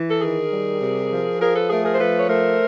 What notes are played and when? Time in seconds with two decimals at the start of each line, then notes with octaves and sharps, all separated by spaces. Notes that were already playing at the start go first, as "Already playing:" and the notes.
Already playing: E3
0.10 A4
0.22 D#3 G#4 A#4
0.52 G3
0.81 C3
1.11 F3
1.40 F3 G#4 A#4
1.55 A4 B4
1.69 A3 G#4 A#4
1.85 G#4 A#4
1.94 C5
1.99 F3 A4 B4
2.18 C#5
2.29 A3 A#4 C5